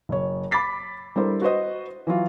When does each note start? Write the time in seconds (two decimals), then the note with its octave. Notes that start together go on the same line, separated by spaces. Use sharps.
0.09 F#1 C#5
0.51 B5 D6 A6 B6 C7
1.16 G3 D4 E4 A4 A#4 C5
1.42 F#4 B4 C5 D#5
2.07 E3 F#3 F4